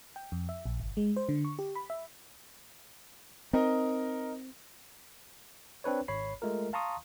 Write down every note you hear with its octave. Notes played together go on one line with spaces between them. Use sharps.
G5
F2
E5
A#1
G1
G#3
C5
D3
C#6
G4
B5
E5
C4 D#4 A#4 D#5
C4 D4 B4 C#5
G#1 C#5 B5 C7
G#3 A3 F4 A#4
F5 A5 A#5 C6 C#6 D#6